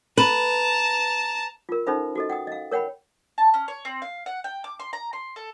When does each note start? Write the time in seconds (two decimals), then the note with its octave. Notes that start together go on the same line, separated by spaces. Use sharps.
0.17 B4 A5 A#5
1.69 F4 A#4
1.87 C#4 D#4 A4 C5 E5 B5
2.15 F#4 A4 D#5
2.30 F#5 G5 D#6
2.47 D#5 F5
2.71 A#4 C#5 F#5 G5 B5
3.38 A5
3.54 C#4
3.68 C#5
3.85 C4
4.02 F5
4.26 F#5
4.44 G5
4.64 D6
4.80 C6
4.93 A#5
5.13 C6
5.36 A4